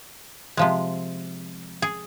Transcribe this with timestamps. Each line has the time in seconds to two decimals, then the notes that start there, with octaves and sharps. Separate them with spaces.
0.57 C3 F3 G#3
1.82 G#4